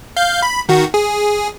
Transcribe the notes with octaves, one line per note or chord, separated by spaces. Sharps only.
F5 G6
B5
D#3 F#4
G#4